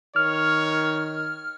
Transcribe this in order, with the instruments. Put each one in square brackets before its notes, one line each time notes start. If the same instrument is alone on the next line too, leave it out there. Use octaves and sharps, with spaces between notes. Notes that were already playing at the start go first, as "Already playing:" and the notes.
[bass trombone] D#3 [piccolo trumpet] C#5 [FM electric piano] F6